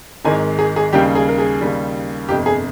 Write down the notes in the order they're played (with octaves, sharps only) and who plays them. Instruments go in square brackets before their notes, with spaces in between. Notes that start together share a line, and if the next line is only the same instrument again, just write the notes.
[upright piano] G#1 G#2 D#3 G#3 G#5
G#4
G#4
D#2 C#3 G3 G4
G#4
A#4
G#4
D#2 C#3 G3
G1 F2 C3 G4
G#4